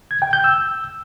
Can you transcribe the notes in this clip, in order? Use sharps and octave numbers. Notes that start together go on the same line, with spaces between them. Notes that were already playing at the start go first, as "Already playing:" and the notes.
G#6
G5
G6
E6